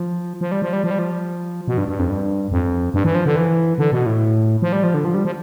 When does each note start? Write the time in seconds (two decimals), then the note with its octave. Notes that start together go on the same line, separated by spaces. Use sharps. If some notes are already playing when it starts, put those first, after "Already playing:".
Already playing: F3
0.41 F3
0.52 G3
0.62 F3
0.73 G3
0.84 F3
0.91 G3
0.99 F3
1.68 B2
1.78 G2
1.89 G2
1.99 F2
2.10 G2
2.52 F2
2.94 G2
3.04 E3
3.15 F3
3.26 D3
3.36 E3
3.78 D3
3.92 B2
4.06 A2
4.62 F3
4.73 G3
4.84 F3
4.94 D3
5.05 F3
5.14 G3
5.25 F3